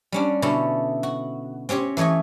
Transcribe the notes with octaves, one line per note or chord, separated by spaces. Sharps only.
G3 C#4 D4
B2 D3 C#4 E4 A4
F#4
C4 C#4 G4 C#5
E3 A3 C#5 D#5 G#5